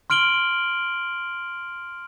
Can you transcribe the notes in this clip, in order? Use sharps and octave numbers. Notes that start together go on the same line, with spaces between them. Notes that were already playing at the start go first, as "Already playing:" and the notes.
C6 F6 D7 F#7 G7